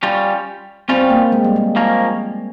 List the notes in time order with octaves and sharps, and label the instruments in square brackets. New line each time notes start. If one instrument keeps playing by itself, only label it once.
[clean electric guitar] G3 C#4 F4
[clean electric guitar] G3 C#4 F4 [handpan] C4
[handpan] A#3
G#3
G3
G#3
[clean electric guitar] F3 A#3 C#4